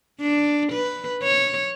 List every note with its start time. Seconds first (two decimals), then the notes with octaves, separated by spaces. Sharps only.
0.21 D4
0.72 B4
1.23 C#5